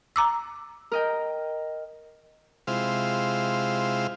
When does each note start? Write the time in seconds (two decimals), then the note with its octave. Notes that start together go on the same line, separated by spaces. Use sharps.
0.16 A#5 D6 E6
0.92 A#4 D#5 G5
2.67 C3 G#3 E4 F4 C5 F5